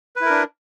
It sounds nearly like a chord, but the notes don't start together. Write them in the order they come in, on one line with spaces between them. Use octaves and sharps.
B4 E4 A#4 D4